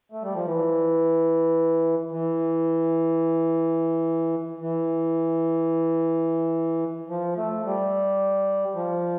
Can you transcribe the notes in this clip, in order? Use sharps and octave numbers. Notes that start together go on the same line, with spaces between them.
A3
G3
F3
E3
E3
E3
F3
A3
G3
F3